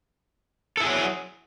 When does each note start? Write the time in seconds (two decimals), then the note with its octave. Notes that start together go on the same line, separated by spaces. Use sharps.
0.77 A4
0.80 E4
0.83 G#4
0.86 F#3